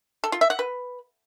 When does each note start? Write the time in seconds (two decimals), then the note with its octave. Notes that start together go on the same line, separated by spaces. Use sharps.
0.24 A4
0.32 F4
0.41 E5
0.50 F#5
0.59 B4